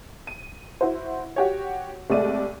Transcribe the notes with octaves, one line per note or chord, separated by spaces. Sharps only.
D#7
E4 F#4 C5
F#4 G4 C#5
C2 G#3 A3 D5 D#7